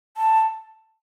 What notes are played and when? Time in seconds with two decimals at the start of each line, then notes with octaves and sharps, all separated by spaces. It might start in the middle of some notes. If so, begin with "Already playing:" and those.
0.17 A5